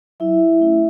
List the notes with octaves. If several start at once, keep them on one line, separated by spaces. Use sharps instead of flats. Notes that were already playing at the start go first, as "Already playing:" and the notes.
F#3 E4 E5
A3 C#4 E4